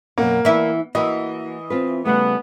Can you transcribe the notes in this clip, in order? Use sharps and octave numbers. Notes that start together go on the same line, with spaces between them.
F#2 B2 A#3 F#5
E3 B3 E4
E3 A#3 F#4 D#5
C4 F4 B4
C#3 G3 A3 B3